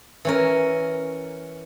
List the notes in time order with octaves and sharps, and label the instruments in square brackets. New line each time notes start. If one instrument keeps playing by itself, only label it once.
[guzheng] E3 C#4 A#4